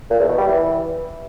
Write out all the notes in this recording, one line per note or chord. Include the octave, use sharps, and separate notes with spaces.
A#2
E2
B2
G3
E3